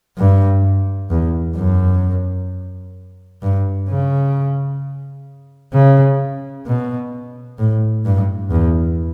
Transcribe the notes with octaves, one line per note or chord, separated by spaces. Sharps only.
G2
E2
F#2
G2
C#3
C#3
B2
A2
G2
E2